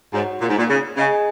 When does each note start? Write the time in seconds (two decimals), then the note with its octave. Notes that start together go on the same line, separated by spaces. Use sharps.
0.13 G#2 F#4 C#5 F#5
0.41 A#2
0.49 G#2
0.58 A#2
0.69 C#3
0.96 C#3 G#4 D#5 G#5